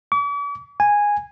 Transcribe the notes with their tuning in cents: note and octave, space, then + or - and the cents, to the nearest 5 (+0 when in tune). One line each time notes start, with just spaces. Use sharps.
D6 -45
G#5 -10